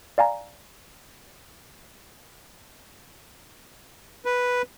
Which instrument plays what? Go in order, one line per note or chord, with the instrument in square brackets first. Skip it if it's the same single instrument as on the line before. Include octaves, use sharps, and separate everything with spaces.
[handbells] D5 F5 G#5 A#5
[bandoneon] B4